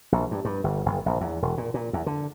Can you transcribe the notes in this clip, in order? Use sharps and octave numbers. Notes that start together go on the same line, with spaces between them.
A#1
G2
G2
G1
F#1
A#1
E2
E1
A#2
A#2
E2
D3